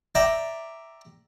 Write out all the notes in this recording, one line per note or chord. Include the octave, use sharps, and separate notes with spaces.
D5 E5 G5 A#5